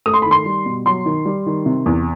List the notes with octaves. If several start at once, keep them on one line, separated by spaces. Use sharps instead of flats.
A3 D#6
C6
B5
D#3
C6
G3
B2
F#3 C6
D#3
G3
D#3
C3
E2